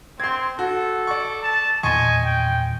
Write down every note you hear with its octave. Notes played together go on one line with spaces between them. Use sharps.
C4 C6 G#6
F#4 A4
D5 C#6
A5
E2 A#2 D#3 D#5 G#5 C6 C#6
G5